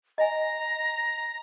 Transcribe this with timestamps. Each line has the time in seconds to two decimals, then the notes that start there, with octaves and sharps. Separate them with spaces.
0.18 D#5 G#5 A#5